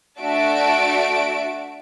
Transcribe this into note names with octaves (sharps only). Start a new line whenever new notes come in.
A3 D4 F#4 E5 A5 D7